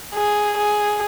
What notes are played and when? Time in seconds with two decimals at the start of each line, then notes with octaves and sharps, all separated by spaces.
0.15 G#4
0.58 G#4